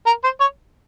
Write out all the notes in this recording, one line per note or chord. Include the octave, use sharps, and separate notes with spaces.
A#4
C5
C#5